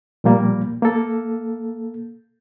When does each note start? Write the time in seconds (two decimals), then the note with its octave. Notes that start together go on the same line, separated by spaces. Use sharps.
0.24 A#2 F3 G3 A#3
0.82 A#3 A4